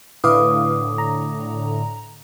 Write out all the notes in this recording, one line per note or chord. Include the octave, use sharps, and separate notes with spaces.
A2 D3 E4 B4 F5 D6 D#6
A#5